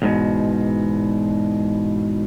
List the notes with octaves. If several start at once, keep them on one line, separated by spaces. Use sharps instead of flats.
E2 G#2 B2